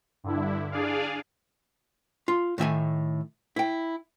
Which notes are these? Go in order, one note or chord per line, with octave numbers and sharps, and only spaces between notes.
G2 D3 E4
D4 G#4 D5 F5
F4
A2 D#3 E5 G#5
E4 G5